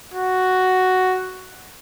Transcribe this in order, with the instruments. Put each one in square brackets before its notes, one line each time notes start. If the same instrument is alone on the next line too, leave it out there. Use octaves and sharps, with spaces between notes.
[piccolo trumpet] F#4